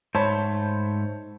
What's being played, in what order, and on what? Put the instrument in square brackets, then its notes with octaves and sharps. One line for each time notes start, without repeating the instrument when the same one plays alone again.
[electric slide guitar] G#2 A3 C5 [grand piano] C#5 A5 B5